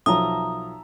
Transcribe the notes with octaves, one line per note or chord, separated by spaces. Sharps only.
B1 F3 E5 A5 A#5 D#6